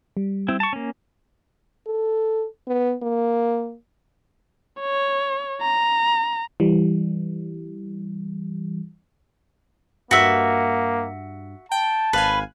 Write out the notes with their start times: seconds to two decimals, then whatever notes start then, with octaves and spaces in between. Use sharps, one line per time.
0.17 G3
0.48 C4 E4
0.60 A5 C#6
0.73 A#3 C#4
1.87 A4
2.67 B3
3.02 A#3
4.80 C#5
5.62 A#5
6.60 E3 G3
10.11 G2 A#3 F#4 E5
11.72 G5 A5
12.13 G#1 B4 F5 G#5